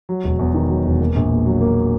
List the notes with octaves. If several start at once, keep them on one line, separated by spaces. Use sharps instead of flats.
F#3
E1
E2
D#3
F#3
E1
A#3
A#1
A#2
F#3
A#3